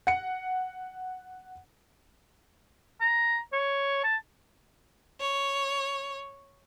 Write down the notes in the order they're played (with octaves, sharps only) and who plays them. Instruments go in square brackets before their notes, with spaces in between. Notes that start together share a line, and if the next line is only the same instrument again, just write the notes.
[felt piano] F#5 C#7
[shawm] A#5
C#5
A5
[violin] C#5